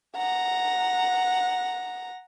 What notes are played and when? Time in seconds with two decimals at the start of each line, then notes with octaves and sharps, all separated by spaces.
0.16 F#5 A#5